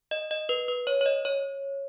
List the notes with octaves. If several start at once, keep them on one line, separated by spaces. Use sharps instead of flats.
D#5
D#5
B4
B4
C#5
C#5
D#5
C#5